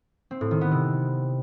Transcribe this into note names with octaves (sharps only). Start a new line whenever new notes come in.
C4
A2
D#3
B3
C3